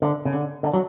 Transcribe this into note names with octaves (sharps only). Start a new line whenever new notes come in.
D3
C#3
D3
D3
F#3